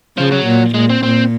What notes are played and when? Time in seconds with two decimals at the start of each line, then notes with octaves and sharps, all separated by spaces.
0.17 C#3 F3
0.32 F#3
0.46 A#2
0.74 A#2 G#3
0.90 C4
1.03 A#2 C4